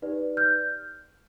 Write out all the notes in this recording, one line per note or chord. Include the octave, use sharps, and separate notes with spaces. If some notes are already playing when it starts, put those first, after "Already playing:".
D#4 G4 B4 D5
F6 G6